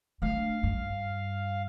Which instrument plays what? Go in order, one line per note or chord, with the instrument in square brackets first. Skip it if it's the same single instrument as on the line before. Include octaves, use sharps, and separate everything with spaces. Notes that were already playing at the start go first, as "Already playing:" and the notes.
[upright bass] A3 D4 [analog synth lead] F5
[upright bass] G2